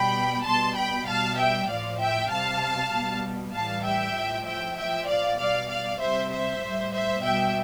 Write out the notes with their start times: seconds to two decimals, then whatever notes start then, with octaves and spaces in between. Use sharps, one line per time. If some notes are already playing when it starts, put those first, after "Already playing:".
Already playing: B2 G3 G5 B5
0.46 B2 G3 A5 C6
0.77 G5 B5
1.08 B2 G3 F5 A5
1.39 E5 G5
1.69 A2 F3 D5 F5
2.00 E5 G5
2.31 C3 G3 F5 A5
2.92 B2 G3
3.54 A2 E3 G3 F5 A5
3.85 E5 G5
4.16 A2 F3
4.47 E5 G5
4.77 A2 F3 E5 G5
5.08 D5 F5
5.39 B2 G3 D5 F5
5.70 D5 F5
6.01 C3 G3 C5 E5
6.32 C5 E5
6.62 A2 G3
6.93 C5 E5
7.24 B2 G3 E5 G5